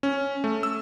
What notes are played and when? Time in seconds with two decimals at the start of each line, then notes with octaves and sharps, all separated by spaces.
0.03 C#4
0.44 A3
0.63 E6